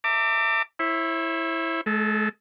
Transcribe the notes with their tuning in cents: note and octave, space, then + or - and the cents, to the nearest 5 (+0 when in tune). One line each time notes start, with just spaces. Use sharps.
E5 +0 A5 +45 D6 +0
E4 +0 C#5 -45 E5 +0
G#3 +45 A4 +0